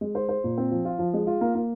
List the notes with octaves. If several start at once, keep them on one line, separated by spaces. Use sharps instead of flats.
G#3
C5
C5
A#2
C4
F3
F4
F3
G#3
F4
A#3
A#3